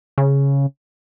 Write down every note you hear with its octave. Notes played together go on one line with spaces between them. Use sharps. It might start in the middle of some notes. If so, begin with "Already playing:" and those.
C#3